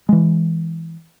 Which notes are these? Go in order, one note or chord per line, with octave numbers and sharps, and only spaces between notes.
E3 G#3